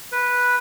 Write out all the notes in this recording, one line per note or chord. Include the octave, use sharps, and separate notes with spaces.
B4